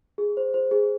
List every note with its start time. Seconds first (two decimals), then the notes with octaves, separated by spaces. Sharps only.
0.18 G#4
0.37 C5
0.54 C5
0.71 G#4